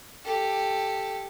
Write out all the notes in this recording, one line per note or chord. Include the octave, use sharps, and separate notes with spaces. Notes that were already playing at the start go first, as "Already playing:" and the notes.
G4 A4